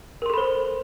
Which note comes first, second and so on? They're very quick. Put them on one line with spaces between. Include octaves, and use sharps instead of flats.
A#4 C6 A4 B5 C5